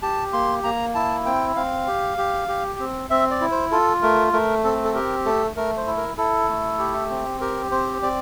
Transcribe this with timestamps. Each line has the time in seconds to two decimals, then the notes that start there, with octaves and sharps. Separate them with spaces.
0.02 G4 A5
0.33 A#3 C6
0.64 A#3 A#5
0.95 E4 A5
1.25 C4 G5
1.56 C4 F5
1.87 G4
2.18 G4
2.49 G4
2.79 C4
3.10 C4 E5
3.31 D5
3.41 E4
3.51 C5
3.71 F4 A4
4.02 A3 A#4
4.33 A3 A#4
4.64 C4 A4
4.84 A4
4.94 G4 A#4
5.25 A3 A4
5.56 A3 A#4
5.77 C5
5.87 E4
5.97 A#4
6.17 E4 A4
6.49 A3
6.79 G4
7.10 C4
7.41 G4 A#4
7.71 C4 C5
8.02 C4 D5